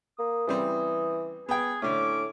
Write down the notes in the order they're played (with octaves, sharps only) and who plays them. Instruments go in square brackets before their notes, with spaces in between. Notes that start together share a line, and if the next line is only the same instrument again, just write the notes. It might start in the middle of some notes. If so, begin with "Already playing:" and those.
[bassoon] A#3 [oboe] D#6
[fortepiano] C#3 G3 C4 [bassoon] E3
[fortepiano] B3 G5 [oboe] G#4
[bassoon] A2 [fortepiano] D3 A3 [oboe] C#4 [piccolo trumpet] D6